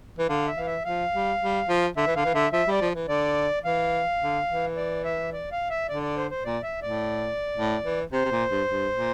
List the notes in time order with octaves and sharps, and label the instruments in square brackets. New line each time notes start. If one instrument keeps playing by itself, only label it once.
[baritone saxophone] E3
[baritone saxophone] D3 [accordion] F5
[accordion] E5
[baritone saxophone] E3 [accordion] F5
[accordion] E5
[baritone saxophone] F3 [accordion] F5
[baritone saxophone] G3
G3
F3
[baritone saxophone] D3 [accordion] E5
[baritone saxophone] E3
[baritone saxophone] D3 [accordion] F5
[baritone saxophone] E3
[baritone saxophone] D3 [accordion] E5
[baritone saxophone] F3 [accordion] E5
[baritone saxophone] G3 [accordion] D5
[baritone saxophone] F3
E3
[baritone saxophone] D3 [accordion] D5
[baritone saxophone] E3 [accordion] F5
[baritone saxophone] D3
E3
[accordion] D5
E5
D5
F5
E5
[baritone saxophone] D3 [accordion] D5
[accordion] D5
C5
C5
[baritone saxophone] A#2 [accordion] D5
[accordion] E5
[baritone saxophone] A2 [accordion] D5
[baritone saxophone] A2
E3
[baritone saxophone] C3 [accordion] C5
[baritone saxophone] C3
A#2
G2
G2
A#2